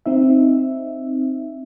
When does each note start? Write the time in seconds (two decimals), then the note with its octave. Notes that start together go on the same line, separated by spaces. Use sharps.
0.06 C4 D#4 E5